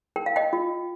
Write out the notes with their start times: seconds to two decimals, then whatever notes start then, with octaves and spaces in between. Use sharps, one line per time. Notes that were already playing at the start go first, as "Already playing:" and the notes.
0.16 A#4 G5
0.26 F5
0.36 D#5 G5
0.53 F4